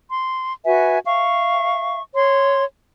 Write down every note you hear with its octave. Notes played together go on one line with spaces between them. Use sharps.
C6
F#4 B4 E5 G#5
E5 F5 C#6
C#5 C6